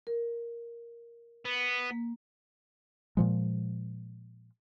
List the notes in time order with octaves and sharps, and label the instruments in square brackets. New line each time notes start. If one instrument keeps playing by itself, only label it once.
[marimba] A#4
[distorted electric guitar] B3
[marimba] A#3
[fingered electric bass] A#2 F3 G#3